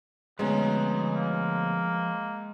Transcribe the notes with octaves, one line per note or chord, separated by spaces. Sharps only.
D2 B2 F3 G#3 C#4 B4 A#5
A#3